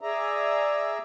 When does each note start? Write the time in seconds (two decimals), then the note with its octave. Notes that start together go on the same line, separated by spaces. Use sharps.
0.01 G#4 D5 E5 A#5